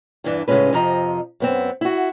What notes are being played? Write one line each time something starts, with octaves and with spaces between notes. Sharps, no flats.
E2 G2 E3 D4
A2 C#3 E3 G#3 C#4 B4
F2 C3 F3 D#5 A#5
F#2 B3 C4
E4 F#4